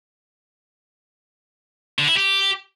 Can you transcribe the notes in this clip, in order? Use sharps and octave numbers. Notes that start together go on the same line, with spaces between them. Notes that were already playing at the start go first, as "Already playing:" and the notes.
D3
E4
G4